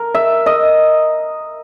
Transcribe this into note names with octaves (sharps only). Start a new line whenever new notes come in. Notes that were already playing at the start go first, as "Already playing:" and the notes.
Already playing: A#4
E5
D#5